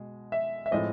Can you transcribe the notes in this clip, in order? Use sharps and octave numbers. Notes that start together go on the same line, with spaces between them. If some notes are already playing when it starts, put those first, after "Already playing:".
Already playing: B2 G#3
E5
E5
A2 F3 G#3 C4 D#5